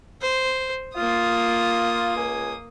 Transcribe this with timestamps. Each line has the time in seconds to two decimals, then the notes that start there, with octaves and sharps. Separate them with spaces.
0.21 C5
0.95 A#3 F4 D#6
2.16 C#2 G#5